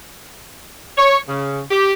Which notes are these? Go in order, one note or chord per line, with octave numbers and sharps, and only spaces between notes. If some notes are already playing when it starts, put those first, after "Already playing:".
C#5
C#3
G4